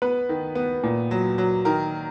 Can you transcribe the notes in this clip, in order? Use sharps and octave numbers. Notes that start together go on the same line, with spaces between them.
B3 B4
D#3
B3
A#2
F#3
F#3
D#3 A#4